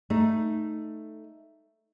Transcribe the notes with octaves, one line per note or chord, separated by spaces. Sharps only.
A3 D#4